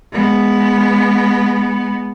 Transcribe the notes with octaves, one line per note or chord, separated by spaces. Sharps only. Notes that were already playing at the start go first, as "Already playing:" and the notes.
G#3 B3